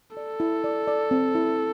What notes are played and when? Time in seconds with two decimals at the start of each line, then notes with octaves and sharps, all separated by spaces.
0.17 A4 D5
0.40 E4
0.64 D5
0.87 D5
1.11 C4
1.35 E4